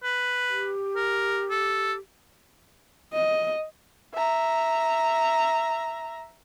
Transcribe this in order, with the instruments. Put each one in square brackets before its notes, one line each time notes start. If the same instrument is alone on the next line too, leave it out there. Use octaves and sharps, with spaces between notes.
[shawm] B4
[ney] G4
[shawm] A#4
A4
[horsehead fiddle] D#5
[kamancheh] E5 A#5